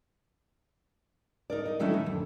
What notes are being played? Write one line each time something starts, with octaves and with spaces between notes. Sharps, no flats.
D#4 A#4 D5
D#4 D#5
D#3 F#3 A3 C#4 D4 E4
D#3
F2 D3